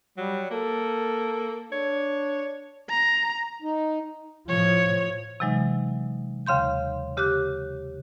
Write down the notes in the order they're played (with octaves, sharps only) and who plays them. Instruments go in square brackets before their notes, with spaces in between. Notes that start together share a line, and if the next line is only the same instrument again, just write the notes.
[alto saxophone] F#3 [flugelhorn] G3
[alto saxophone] A#3 [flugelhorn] A4
[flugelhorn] D4 [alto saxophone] C#5
[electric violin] A#5
[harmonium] D#4
[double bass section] A2 F3 [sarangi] C#5
[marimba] C3 E3 F#3 G#3 D#4
D#2 C#3 F5 C6 G6
C#3 G4 D6 F#6